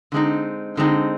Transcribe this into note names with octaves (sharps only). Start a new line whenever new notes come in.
D3 G#3 C4 D#4
D3 G#3 C4 D#4